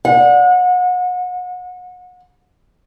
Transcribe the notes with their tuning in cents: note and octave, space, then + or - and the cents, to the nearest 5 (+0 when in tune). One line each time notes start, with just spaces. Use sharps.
F#5 -35